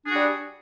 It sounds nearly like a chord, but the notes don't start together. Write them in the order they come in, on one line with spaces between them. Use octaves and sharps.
D4 G#4 F#4 G3